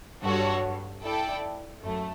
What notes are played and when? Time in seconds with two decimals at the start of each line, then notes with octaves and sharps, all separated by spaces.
0.23 G2 F#4 A4 C#5
1.03 E4 A4 D5 G5
1.83 F#2 A3